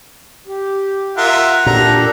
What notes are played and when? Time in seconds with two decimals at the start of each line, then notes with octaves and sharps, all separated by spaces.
0.47 G4
1.17 F4 A#4 E5 F#5
1.66 A#2 D4 G4 A4 A#5